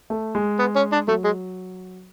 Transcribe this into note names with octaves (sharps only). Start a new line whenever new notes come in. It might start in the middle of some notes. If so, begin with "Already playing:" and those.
A3
G#3
B3
C#4
D4
F#3 A3
G#3